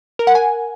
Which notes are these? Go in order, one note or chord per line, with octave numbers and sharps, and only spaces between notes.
A#4
F#5
G#5